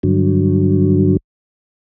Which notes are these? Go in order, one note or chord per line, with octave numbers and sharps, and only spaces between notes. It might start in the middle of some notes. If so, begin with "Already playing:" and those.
G2 D3 F#3